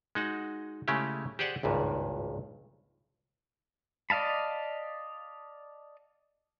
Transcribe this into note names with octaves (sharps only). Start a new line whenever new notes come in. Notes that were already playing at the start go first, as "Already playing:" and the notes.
G#3 D#4 F#4 F#5
C#3 G#3 A3 C#4 E4 G4
G4 G#4 C5 D5 F#5 G#5
G#1 C#2 G2 A#2
D5 D#5 F5 A5 B5